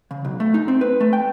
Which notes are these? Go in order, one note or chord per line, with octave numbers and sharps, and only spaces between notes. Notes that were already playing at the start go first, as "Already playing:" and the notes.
C#3
B1
A3
D#4
C4
B4
A3
G5